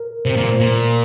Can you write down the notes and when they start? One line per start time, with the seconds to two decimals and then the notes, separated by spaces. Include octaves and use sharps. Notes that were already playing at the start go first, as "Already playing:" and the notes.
Already playing: A#4
0.25 C3 C5
0.37 A#2
0.46 C5
0.60 A#2
0.67 A#4